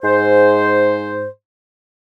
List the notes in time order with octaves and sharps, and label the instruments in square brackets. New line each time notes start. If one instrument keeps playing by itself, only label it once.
[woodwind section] G#2 C5